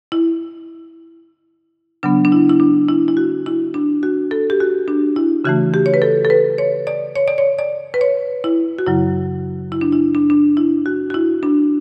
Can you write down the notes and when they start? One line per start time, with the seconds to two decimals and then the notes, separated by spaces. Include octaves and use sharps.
0.12 E4
2.03 C#3 F#3 B3 D4
2.25 D4
2.32 E4
2.49 E4
2.60 D4
2.88 E4
3.08 E4
3.17 F#4
3.46 E4
3.74 D4
4.03 F#4
4.31 A4
4.50 G4
4.60 F#4
4.88 D4
5.16 E4
5.45 C#3 E3 A3 F#4
5.74 G4
5.86 C#5
5.94 B4
6.02 A4
6.25 A4
6.30 B4
6.58 C#5
6.87 D5
7.16 C#5
7.28 D5
7.38 C#5
7.58 D5
7.94 B4
8.01 C#5
8.44 E4
8.79 F#4
8.87 F#2 C#3 F#3 E4
9.72 E4
9.81 D4
9.92 E4
10.15 D4
10.30 D4
10.57 E4
10.86 F#4
11.10 F#4
11.14 E4
11.43 D4